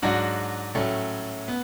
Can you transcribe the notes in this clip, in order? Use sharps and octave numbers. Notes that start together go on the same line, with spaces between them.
G#2 F#3 D4 F#4
A2 F#3 A3 C#4
B3